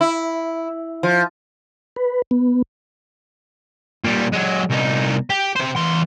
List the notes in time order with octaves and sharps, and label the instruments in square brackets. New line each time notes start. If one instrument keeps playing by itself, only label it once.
[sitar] E4
F3
[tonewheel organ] B4
B3
[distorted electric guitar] A#2 G3
F#3 G#3
C2 D#4
G4
C3 C5
E2 C6